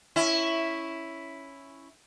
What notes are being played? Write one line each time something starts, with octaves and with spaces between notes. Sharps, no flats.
C#4 E4